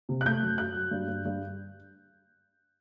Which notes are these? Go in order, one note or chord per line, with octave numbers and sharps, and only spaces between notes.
C3
F#6
A3 G6
F#2
F#3 F#6
F#3
G2
G2
G2